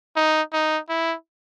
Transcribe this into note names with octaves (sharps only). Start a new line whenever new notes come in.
D#4
D#4
E4